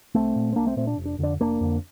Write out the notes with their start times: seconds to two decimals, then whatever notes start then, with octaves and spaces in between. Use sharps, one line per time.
0.15 C2 A3 C4
0.36 A#2
0.53 C4
0.56 C2 A#3 D4
0.66 A3 C4
0.77 A#2 A3 C4
0.87 D4
0.98 F1
1.05 D4
1.19 F2 D3 D4
1.40 F1 A#3 D4
1.61 F2 D3